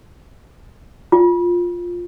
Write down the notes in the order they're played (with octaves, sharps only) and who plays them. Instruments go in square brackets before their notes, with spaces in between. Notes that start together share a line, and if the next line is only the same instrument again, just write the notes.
[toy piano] F4